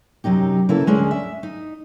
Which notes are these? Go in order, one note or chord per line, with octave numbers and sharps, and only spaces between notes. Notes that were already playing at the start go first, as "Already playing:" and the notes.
F#2 C3 F#3 D#4 G4
C#3 A#3 E4 A4 B4
D2 G#3 C#4 D4
E5
D#4